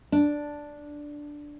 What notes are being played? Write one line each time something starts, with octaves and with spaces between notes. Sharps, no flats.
D4